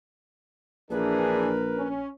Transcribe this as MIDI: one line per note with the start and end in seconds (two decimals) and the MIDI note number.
0.91 2.07 34
0.91 1.52 52
0.91 1.52 62
0.91 1.52 68
0.91 1.89 70
0.91 1.88 71
1.77 2.10 61